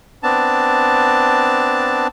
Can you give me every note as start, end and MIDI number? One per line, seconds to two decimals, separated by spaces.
0.23 2.07 59
0.23 2.07 60
0.23 2.07 62
0.23 2.07 81